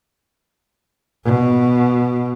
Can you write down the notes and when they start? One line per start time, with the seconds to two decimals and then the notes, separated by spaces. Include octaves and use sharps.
1.24 B2